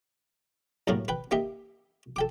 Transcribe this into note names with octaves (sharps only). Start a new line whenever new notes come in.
C2 F#2 A2 F#3 A#3 A#4
B4 G5
A#3 D#4 G4 E5
A4 G5 D6